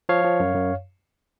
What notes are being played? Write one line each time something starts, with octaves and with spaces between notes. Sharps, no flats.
F3 C#5 F5
F3
F#2
F#2